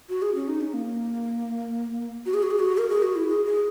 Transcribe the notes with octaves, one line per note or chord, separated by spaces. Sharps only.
F#4
G#4
C#4
D#4
C#4
A#3
F#4
G#4
F#4
G#4
F#4
A#4
G#4
F#4
E4
G#4
G#4